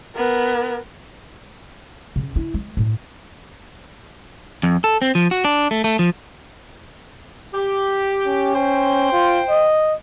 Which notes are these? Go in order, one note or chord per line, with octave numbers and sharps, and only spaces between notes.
B3 A#4
C#3
E4
G#3
A2
F2
A4
C4
F3
F#4
D4
A3
A3
F3
G4
C#4
C5 G5
F4
D#5